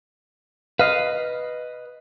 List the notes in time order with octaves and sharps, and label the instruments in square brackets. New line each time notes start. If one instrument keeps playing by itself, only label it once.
[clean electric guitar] B4 D#5 [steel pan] F5